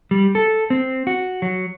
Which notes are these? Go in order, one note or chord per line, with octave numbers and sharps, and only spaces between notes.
G3
A4
C4
F#4
F#3